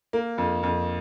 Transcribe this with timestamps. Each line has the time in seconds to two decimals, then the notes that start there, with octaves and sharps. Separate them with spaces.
0.13 A#3
0.38 F2
0.63 F2